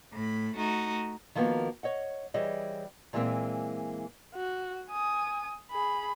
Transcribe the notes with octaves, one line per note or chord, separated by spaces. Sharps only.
A2 B5
A3 D#4 F#4
D#3 F3 G3 A#3 B3 F#4
C#5 D#5 F#5
E3 G3 G#4 C#5 D#5
A#2 E3 G3 G#3 A#3 C4
F#4
G#5 D#6
G#4 B5